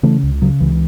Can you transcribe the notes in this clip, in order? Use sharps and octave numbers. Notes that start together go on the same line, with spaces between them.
C#3 E3 A3
C#2
C#3 F#3
C#2 E3